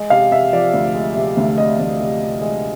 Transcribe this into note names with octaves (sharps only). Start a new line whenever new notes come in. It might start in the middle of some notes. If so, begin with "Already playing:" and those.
Already playing: G#3
C3 F5
C3 E5
F3 D5
D2
G#3
C3
D2
C3 D#5
D2
C3
C3
G#3